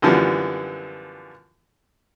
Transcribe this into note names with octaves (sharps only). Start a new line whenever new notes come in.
F#2 D3 E3 F3 G3 B3